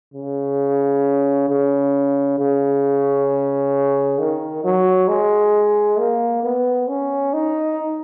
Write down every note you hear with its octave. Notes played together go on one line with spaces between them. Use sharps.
C#3
C#3
C#3
D#3
F#3
G#3
A#3
B3
C#4
D#4